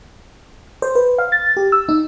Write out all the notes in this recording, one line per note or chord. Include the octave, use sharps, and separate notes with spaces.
C5
B4
F5
A6
G4
E6
D#4